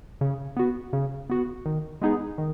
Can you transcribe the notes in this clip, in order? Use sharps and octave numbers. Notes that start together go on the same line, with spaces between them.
C#3
B3 F#4
C#3
B3 F#4
D#3
G#3 B3 D#4 G#4
D#3